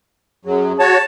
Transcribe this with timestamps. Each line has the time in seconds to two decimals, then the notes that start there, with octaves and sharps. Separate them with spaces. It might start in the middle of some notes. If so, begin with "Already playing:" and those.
0.45 F#2 F#3 G#4
0.79 F#4 C#5 A5